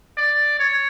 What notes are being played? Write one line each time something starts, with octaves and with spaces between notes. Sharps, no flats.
D5
C#5